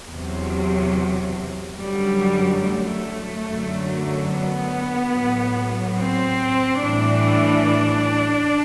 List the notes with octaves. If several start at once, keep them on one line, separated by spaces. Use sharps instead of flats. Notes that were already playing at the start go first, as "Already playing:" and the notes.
E2 C3 F#3
F#2 D3 F#3 G3
A3
F#2 D3 F#3
B3
A2 F#3
C4
A2 E3 G3 D4